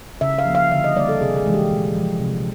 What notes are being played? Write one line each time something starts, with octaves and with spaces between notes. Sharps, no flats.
C#3 E5
F5
F3 A#3
F5
D3 E5
D#5
G3 A#3 D5
A4
C3 G#4
G#4
E3 G#3
G4
A#2
F3 G#3
C3